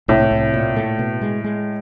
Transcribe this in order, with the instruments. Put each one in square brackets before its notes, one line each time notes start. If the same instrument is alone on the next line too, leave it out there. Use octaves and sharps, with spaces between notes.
[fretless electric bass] C2 [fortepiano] A2
[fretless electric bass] C2
A#2
A3
B2
G#3
G#3